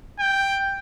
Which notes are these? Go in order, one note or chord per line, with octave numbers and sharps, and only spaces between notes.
G5